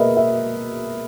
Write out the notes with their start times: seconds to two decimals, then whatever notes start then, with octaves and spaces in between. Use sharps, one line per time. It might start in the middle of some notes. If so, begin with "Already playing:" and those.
Already playing: B2 A#3 G#4 A#4 B4 D#5 E5
0.17 E5